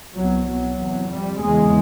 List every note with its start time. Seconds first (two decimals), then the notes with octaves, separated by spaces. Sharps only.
0.15 C2 B2 F#3
0.47 C2 B2 F#3
0.79 E2 C3
1.10 F2 C3 G3
1.42 E2 C#3 G#3